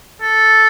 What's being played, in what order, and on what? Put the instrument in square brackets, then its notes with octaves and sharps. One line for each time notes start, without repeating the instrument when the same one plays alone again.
[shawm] A4